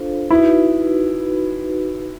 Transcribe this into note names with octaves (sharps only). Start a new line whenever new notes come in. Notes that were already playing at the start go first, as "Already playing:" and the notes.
Already playing: D4 F4 A4 C5 F5
D#4 E4 F#4 B4